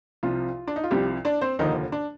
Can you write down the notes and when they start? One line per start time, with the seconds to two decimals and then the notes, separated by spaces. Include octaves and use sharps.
0.23 C2 C3 F3 F4
0.68 D4
0.76 D#4
0.84 F4
0.91 C2 C3 F3 G3 G4
1.25 D4 D5
1.41 C4 C5
1.59 F1 D#2 D3 D#3 F3 D#4
1.92 D4